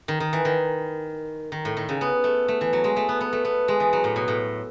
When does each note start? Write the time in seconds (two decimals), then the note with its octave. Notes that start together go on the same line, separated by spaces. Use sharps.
0.08 D#3
0.20 D#3
0.33 E3
0.45 D#3
1.52 D#3
1.65 A2
1.77 D#3
1.89 C#3
2.01 B3
2.24 A3
2.48 A3
2.61 E3
2.73 F#3
2.84 G#3
2.96 A3
3.09 B3
3.21 B3
3.33 A3
3.45 B3
3.68 G#3
3.80 E3
3.93 F#3
4.04 A2
4.16 B2
4.28 A2